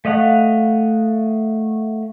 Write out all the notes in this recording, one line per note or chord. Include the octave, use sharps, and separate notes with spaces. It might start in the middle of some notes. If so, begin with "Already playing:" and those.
A3 D#5 F5 F#5